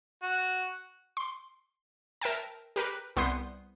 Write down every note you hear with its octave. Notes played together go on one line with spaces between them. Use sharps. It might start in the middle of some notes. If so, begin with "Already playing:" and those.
F#4
C6
A#4 E5 G5 A5
G4 A#4 B4
C2 B3 C6 D#6 G6 C7